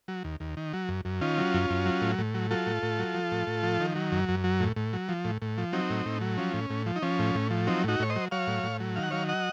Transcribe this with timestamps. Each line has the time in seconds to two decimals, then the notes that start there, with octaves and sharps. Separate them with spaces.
0.08 F#3
0.24 D#2
0.40 D#2
0.57 D#3
0.73 F#3
0.89 F#2
1.05 F#2
1.21 D#3 C#4 F4
1.38 F#3
1.54 F#2
1.70 F#2
1.86 F#3
2.02 A2
2.18 A2
2.34 F#3
2.51 F#3 F4 A4
2.66 A2
2.83 A2
2.99 F#3
3.15 F3
3.32 A2
3.47 A2
3.63 F3
3.80 D#3
3.96 F#3
4.12 F#2
4.29 F#2
4.44 F#3
4.60 A2
4.76 A2
4.93 F#3
5.09 F3
5.25 A2
5.42 A2
5.58 F3
5.73 F#3 C4 D#4
5.90 A2
6.06 A2
6.21 F#3
6.37 F3 C#4
6.54 A2
6.70 A2
6.86 F3
6.96 D#4
7.02 F3 C#4
7.19 A2
7.35 A2
7.51 F3
7.67 F#3 C4 D#4
7.84 A2 D#4 F#4
8.00 A2 C#5
8.10 C5 D#5
8.16 F#3
8.31 F#3 C#5 F5
8.47 A2
8.64 A2
8.80 F#3
8.96 D#3 F5
9.04 F#5
9.11 F#3 C#5 F5
9.29 D#5 F#5